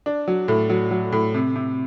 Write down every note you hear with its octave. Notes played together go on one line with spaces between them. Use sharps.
D4
F#3
A2
F#3
F#3
A2
C3
C3